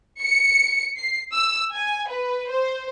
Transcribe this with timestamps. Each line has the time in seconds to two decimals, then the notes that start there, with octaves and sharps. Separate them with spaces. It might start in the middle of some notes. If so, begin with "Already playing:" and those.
0.21 C#7
0.97 C7
1.34 E6
1.75 G#5
2.09 B4
2.49 C5